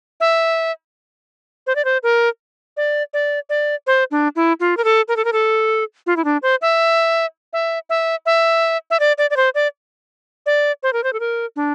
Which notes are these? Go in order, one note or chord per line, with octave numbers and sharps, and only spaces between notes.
E5
C5
D5
C5
A#4
D5
D5
D5
C5
D4
E4
F4
A#4
A4
A#4
A4
A#4
A4
F4
E4
D4
C5
E5
E5
E5
E5
E5
D5
D5
D5
C5
D5
D5
C5
A#4
C5
A4
A#4
D4